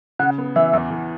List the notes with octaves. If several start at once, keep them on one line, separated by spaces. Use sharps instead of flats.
C#3 F#5
B3
E3 E5
E2
E2